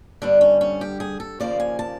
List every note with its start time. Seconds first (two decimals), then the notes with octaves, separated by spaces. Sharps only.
0.22 G2 D3 G3 B3 D4
0.41 C#4
0.61 C#4
0.81 G4
1.00 G#4
1.20 A4
1.40 D#2 C#3 F3 A#3 D5
1.60 G#5
1.79 A5